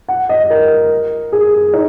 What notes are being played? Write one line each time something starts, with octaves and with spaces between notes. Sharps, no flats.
F#5
D#5
A#4
G#4
D#4